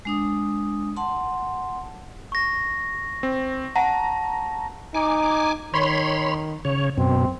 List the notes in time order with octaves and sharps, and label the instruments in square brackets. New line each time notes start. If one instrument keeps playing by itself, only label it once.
[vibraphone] G#3 D4 D#6
F#5 A5 C6
[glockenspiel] C#6 A#6
[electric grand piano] C4
[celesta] F#5 [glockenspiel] A5 [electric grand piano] A#5
[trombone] D#4 [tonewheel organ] G#5 D6
[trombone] D#3 [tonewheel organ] C#5 B5 C6
[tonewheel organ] C#3 C#5
[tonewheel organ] F#2 B2 [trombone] C4